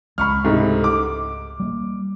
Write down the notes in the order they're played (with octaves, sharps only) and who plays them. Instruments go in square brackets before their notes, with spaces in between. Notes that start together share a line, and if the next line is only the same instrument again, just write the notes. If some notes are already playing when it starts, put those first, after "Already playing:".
[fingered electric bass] C#2 G#3 [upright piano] B5 C#6 F6
[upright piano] C2 G#2 A3
D6
[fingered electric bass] G3 A#3